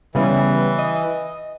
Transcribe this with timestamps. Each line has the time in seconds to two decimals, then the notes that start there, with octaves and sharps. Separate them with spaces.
0.15 C#3 E3 G3 B3
0.79 D#5